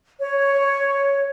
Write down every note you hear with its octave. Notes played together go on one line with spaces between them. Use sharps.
C#5